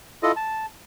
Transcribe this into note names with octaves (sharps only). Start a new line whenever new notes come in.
E4 F4 A4 D#5
A5